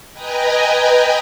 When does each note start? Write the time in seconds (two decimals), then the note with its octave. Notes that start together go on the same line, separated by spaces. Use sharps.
0.13 B4 D#5 G5 G#5 A#5